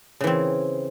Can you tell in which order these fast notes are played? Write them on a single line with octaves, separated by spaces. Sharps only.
C#3 E3 C4